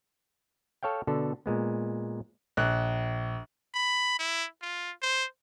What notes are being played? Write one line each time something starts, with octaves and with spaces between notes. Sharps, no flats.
A4 C#5 F5 G5
B2 D3 A4
A#2 G#3 B3
A#1 F#6
B5
E4
F4
C5